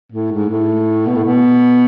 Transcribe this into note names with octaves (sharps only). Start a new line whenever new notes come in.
A2
G#2
A2
B2
A2
B2